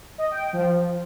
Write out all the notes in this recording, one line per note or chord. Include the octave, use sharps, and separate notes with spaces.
D#5
G5
F3